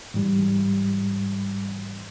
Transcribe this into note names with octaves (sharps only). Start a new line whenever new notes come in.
G#2 E3 G3